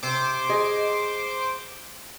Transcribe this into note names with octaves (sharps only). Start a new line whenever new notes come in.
C3 C5 D6
G#4 D#5